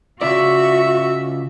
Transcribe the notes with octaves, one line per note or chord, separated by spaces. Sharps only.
C#3 F4 F#4 D5 E5